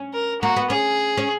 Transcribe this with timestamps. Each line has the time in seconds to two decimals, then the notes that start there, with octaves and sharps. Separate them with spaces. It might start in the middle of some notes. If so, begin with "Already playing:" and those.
Already playing: C#4
0.13 A#4
0.42 A#3 F#4
0.56 B3
0.70 C#4 G#4
1.17 C#4